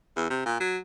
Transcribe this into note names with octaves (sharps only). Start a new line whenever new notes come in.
E2
C3
A#2
F#3